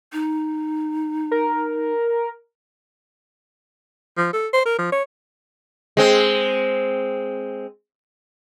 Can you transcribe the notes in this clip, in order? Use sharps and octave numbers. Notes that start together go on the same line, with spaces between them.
D#4
A#4
F3
A4
C5
A#4
F3
C#5
G#3 C4